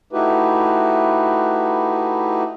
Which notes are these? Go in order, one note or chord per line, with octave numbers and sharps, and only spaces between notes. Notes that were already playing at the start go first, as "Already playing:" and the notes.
A3 D#4 E4 F#4 G4 B4